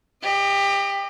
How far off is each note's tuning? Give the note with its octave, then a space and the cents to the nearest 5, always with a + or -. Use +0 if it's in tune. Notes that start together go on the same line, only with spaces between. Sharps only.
G4 +20 D#5 -15